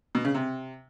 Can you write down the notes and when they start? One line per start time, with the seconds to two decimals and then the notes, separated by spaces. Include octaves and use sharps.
0.15 B2
0.25 C#3
0.35 C3